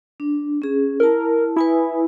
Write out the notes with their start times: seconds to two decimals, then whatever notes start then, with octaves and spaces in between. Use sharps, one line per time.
0.20 D4
0.62 C#4 G#4
1.00 E4 A#4 A5
1.56 E4 B4 G#5 D#6